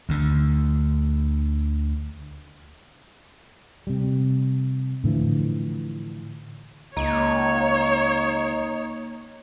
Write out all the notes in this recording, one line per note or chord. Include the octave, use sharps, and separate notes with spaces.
D2 D3
C3 G3
A2 D3 E3 F3
C#2 A#3 D#4 C#5